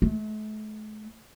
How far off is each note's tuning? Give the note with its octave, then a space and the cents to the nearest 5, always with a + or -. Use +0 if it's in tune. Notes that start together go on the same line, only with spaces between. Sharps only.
A3 -45